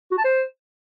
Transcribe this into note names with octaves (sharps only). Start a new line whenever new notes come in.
F#4
A5
C5